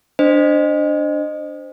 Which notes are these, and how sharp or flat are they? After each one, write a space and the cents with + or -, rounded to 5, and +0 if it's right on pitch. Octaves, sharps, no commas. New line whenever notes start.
D4 +0 C5 +0 D#5 -25